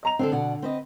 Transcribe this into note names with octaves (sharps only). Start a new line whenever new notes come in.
D#5 A#5 F7
D3 C4 D4 A4
B2 D5 F#5
C4 B4 D#5